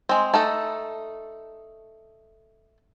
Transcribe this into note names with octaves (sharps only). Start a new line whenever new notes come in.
G#3 C4
A3 D#4 A4